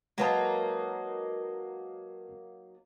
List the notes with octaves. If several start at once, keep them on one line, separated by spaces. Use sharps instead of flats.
F#3 G#3 A#3 D#4 B4 A5